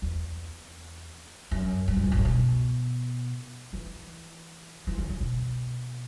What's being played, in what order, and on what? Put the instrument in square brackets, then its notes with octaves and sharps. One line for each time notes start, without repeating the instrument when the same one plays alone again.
[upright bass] E2
F#2
G2
E2
F#2
G2
A2
B2
E3
E3
D3
C#3
B2